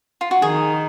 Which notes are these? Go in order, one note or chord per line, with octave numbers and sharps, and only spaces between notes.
F4
F#4
D#3 G#4